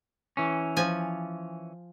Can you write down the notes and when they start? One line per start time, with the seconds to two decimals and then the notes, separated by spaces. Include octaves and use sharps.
0.37 E3 C#4
0.77 F3 G#5